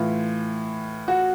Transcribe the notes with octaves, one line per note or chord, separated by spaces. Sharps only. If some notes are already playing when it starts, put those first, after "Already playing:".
Already playing: A2 E3 F4
F#4